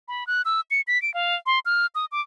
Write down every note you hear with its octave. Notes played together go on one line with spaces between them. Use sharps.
B5
F#6
E6
C#7
B6
D7
F5
C6
F6
D#6
D6